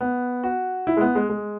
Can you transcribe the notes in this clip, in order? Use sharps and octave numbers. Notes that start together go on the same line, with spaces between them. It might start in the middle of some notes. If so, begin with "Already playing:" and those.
B3
F#4
E4
G#3
B3
G#3
G#3